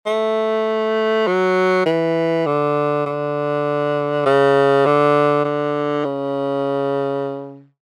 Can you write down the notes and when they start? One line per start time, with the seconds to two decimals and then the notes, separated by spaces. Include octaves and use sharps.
0.06 A3
1.27 F#3
1.86 E3
2.46 D3
3.06 D3
4.26 C#3
4.86 D3
5.45 D3
6.04 C#3